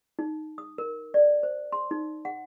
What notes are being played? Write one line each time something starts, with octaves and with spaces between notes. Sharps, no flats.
D#4
D#6
A#4
D5
C5
C6
D#4
F#5